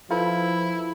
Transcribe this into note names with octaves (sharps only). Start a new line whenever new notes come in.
F3 E4 F4 A4 B4